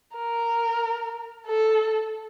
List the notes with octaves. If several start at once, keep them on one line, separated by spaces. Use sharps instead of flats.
A#4
A4